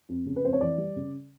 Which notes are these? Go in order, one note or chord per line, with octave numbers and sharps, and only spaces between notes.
F2
C#3
B4
F2 C5
C#5
E3 D5
G3
C#3